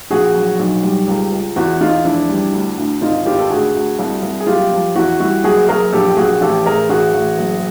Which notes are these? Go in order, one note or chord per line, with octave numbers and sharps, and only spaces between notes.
A#1 F#4 G#4
F#3
B1
G3
C#2
C#2
E2 E4 F#4
E2 D#4 F4
F1 D4 E4
G3
D2
D2
G#1 D#4 F4
G#1 F4 G4
A4
D2 F#4 G#4
D2
C2
C2
G#4
F#1 F4 G4
F3
E2 E4 F#4
G3 E4 F#4
F#1 F#4 G#4
F#1 G#4 A#4
A#1 G4 A4
A#1 F#4 G#4
A1 G4 A4
A1 G#4 A#4
A1 F#4 G#4
A1
F#1